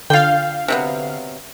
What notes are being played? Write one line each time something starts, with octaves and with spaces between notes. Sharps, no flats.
D3 F4 F5 G5
C3 F#3 B3